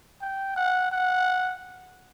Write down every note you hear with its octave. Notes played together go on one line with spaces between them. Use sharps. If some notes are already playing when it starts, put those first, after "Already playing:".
G5
F#5
F#5